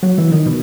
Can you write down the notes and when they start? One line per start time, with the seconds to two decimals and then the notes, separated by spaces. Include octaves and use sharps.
0.03 F#3
0.18 E3
0.32 D#3
0.46 B2